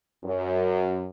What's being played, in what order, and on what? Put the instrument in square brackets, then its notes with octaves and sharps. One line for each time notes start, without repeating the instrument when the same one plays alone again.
[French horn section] F#2